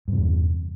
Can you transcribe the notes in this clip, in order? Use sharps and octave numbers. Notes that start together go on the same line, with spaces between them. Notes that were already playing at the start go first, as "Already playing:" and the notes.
E2 G2 C3